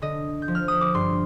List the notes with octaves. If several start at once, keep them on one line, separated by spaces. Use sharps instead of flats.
D3 D#5
G6
F3
F6
D#6
D6
G2 C6